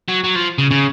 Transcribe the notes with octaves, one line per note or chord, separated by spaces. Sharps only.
F#3
F#3
F3
C#3
C#3